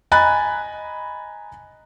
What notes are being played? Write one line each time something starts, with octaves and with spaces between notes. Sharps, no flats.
D#5 G#5 A#5 B5 F#6 A6